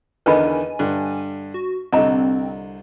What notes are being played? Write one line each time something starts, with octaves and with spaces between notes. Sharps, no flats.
E2 D3 D#3 B4 D#5 G#5 B5
G2 D3
F#4
C2 D3 C4 D#5 A#5